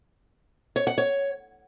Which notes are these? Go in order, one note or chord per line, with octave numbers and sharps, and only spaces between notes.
C#5
F#5
C#5